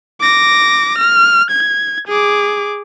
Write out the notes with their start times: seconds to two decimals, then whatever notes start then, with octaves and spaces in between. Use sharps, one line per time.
0.21 D6 A#6
0.99 F6
1.51 G#6
2.08 G#4 D6